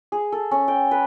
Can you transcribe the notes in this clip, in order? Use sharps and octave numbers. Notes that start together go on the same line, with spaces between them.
G#4
A4
C#4
G5
B4